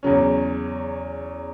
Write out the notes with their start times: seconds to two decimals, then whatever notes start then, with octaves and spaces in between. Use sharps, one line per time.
0.03 E2 C#3 F#3 C#4